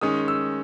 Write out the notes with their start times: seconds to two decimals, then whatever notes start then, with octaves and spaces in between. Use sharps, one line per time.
0.01 D#3 G#3 C#4 D#6
0.28 E6